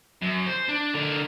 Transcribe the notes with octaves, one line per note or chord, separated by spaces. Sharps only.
F#2
C5
D4
D3 A#4